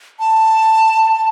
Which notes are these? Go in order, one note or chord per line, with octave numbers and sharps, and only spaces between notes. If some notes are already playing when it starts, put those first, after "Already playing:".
A5